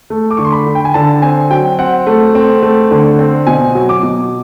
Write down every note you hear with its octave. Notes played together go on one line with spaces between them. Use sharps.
A3
D6
D3 C#6
C6
B5
D3
G5
G#5
D3 A5
C4 G#5
F#3 G5
C4 F#5
A3
C4
A3
D3
C4
B2 G#5
F#3
D6
B2